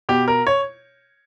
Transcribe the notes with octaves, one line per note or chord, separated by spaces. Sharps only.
B2 G4
A#4
C#5